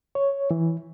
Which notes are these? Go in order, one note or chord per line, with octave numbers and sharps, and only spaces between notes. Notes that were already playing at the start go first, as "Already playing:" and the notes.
C#5
E3